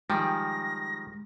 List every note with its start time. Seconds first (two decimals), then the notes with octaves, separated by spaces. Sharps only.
0.10 D#3 F3 G3 G#3 G4 G#4 A#6